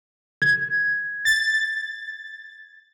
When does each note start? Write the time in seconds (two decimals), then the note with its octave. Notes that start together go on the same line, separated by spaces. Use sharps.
0.42 G#6
1.25 A6